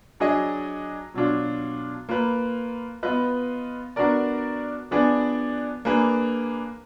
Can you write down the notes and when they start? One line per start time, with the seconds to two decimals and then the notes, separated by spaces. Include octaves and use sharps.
0.20 F#3 D4 G#4 D#5
1.14 B2 F#3 D4 F4
2.09 A#3 F4 B4
3.03 B3 F4 B4 D#5
3.96 B3 D4 F#4 A#4 D5
4.91 F3 B3 D4 G#4 D5
5.85 A#3 D4 G#4 B4